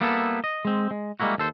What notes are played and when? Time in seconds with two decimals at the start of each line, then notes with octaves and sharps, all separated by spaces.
0.01 G3 A#3 B3 E4 A4
0.44 D#5
0.65 G#3 C4
0.91 G#3
1.20 G3 G#3 A#3 E4 F#4
1.38 D#2 A4 C5